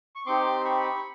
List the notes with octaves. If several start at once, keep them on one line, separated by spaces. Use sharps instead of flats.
C#6
C4 D#4 G4 C6 D6
B5 C#6